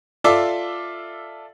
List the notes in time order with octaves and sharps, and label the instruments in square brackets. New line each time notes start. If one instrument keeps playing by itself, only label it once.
[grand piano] F4 A4 D5 E5 D6